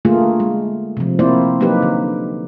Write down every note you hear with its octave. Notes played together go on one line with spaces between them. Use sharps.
D3 A3 A#3 F4 G#4
G#3
C3 F3
A#3 C4 E4 C5 D5
F#3 A#3 D#4 G4 B4
D3